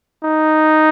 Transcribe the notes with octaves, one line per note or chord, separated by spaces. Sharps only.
D#4